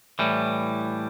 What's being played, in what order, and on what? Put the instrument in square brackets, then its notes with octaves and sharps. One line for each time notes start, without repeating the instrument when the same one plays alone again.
[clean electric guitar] A2 E3 G3